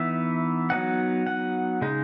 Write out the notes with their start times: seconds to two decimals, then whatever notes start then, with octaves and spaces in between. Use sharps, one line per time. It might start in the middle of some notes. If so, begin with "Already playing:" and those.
Already playing: E3 B3 D#4 E5
0.70 F#3 B3 D#4 F#5
1.27 F#5
1.82 C#3 G#3 D#4